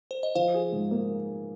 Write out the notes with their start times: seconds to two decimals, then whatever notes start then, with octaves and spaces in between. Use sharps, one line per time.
0.11 C5
0.23 D#5
0.35 F3 C5 F5
0.54 G#4
0.72 G#2
0.91 A#3